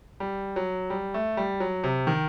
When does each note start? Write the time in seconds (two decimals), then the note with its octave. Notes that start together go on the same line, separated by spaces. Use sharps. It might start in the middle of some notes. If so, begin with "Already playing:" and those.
0.20 G3
0.56 F#3
0.90 G3
1.14 A3
1.37 G3
1.60 F#3
1.84 C3
2.07 D#3